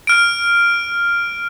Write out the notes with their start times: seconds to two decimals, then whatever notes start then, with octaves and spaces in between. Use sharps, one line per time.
0.07 F6 D7